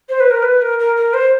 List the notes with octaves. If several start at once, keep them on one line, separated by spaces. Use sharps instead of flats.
C5
B4
A#4
B4
A#4
A#4
A#4
C5